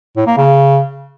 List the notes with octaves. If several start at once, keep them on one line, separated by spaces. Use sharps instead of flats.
A2
A#3
C#3